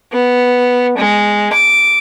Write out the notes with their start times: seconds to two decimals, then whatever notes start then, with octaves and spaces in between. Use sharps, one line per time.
0.12 B3
0.98 G#3
1.53 D6